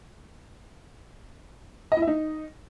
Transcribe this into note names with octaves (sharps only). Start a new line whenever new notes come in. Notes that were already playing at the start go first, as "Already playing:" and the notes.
D#5
E4
E5
D#4